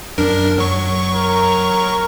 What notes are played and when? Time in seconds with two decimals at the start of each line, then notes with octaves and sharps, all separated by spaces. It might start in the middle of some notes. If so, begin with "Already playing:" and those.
0.18 F#2 D4 A#4
0.58 F#3 C#6
1.13 A#4